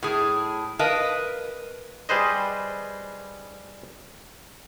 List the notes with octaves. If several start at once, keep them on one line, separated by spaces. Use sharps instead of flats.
A2 G#4
A#4 B4 D#5 F5 A5
G3 G#4 B4 C5 D#5